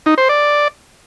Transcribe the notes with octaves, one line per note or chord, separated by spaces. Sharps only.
D#4
C5
D5